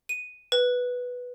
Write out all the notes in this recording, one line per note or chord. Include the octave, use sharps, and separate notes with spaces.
D#7
B4